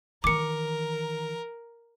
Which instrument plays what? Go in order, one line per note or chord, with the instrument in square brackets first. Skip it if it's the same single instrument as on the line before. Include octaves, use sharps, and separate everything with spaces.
[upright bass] D#3 E3 [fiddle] A#4 [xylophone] D6 C#7